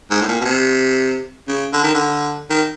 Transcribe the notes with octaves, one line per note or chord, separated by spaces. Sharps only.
G#2
A2
A#2
B2
C3
C#3
D3
D#3
D3
D#3